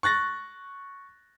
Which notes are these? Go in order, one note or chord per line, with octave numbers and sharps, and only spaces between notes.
C#6 F#6 A6 A#6